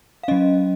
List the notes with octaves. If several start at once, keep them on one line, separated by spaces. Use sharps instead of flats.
F5
F#3 C#4 D#5